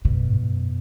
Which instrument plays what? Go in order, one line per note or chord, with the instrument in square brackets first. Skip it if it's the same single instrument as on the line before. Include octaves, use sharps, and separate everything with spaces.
[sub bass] F#2 [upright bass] B2
[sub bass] G#2
G#2
F#2